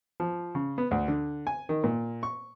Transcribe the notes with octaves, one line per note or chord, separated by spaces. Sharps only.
F3
C#3
B3
D2
D3
G#5
D#3
A#2
C#6